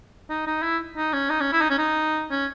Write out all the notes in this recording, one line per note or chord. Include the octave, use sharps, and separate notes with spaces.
D#4
D#4
E4
D#4
C#4
D#4
C#4
E4
D#4
C#4
D#4
C#4